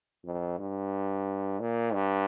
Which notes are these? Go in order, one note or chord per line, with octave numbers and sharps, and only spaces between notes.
F2
G2
A#2
G2